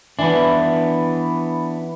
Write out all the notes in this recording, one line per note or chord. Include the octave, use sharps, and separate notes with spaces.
E3 B3 D4